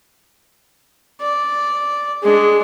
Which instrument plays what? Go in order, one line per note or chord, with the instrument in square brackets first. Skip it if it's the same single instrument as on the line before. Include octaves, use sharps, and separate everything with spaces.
[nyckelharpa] D5
[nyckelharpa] G#3 D4 [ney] G#4